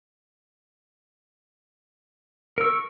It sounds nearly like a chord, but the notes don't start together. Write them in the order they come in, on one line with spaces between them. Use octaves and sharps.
A#4 E6 C#6